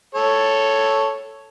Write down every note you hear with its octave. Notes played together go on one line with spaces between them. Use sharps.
A4 C#5